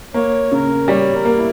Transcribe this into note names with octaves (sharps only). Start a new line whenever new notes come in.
A#3 C#5
C#3 A#4
G3 C#5
A#4
A#3
E4